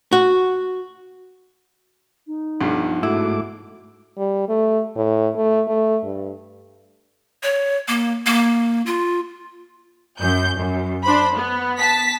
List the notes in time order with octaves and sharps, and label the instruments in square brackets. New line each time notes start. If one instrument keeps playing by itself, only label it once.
[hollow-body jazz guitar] F#4
[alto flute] D#4
[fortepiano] B1 G2 [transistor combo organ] F3
[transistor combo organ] G#2 A3 D6 [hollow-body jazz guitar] E4 [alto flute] F#4
[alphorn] G3
A3
A2
A3
A3
G2
[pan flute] C#5
A#3
A#3
F4
[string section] F#2 G6
F#2
D4 C5 B5
B3
A5 B6